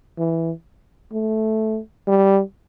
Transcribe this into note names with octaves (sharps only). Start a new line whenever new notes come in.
E3
A3
G3